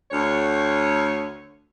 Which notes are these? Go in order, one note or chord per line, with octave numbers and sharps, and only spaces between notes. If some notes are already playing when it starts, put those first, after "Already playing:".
D2 C#5